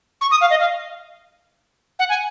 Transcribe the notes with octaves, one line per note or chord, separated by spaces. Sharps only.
C#6
D#6
F5
D#5
F5
F#5
G#5